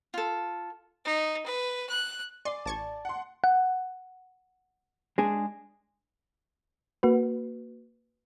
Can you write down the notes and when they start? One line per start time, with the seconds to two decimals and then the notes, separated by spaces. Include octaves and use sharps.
0.14 F4 A4
1.05 D#4
1.46 B4
1.89 F#6
2.45 D5 G#5 C6 D6
2.66 A1 A5 C#6 G#6 A6
3.05 F#5 C6
3.44 F#5
5.18 G#3 D4 G#4
7.03 A#3 F#4 B4